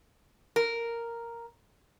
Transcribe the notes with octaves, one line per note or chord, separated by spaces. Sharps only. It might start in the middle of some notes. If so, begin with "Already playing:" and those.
A#4